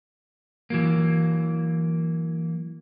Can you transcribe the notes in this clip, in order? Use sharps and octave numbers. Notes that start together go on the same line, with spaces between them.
E3 F#3 A#3